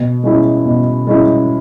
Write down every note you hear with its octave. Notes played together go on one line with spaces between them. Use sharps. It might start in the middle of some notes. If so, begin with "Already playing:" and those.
Already playing: B2
G#3 C#4 E4
B2
G#3 C#4 E4